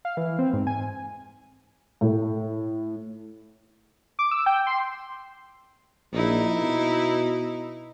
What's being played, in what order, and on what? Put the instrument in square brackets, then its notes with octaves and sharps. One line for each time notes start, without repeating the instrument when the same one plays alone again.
[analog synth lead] F5
E3
C4
G#2
G#5
[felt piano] A2
[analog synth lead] D6
E6
G5
C6
[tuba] A#1 [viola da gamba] D#4 E4
[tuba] B2